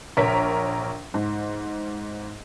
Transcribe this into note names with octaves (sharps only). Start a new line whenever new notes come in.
A#1 A#4 C#5 B6
G#2